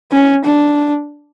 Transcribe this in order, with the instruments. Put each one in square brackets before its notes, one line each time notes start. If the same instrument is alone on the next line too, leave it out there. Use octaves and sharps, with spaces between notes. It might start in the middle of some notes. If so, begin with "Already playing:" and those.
[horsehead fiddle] C#4
D4